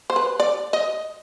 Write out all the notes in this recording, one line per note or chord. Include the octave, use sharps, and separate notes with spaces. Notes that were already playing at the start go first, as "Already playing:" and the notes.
C5
B4
D5
D#5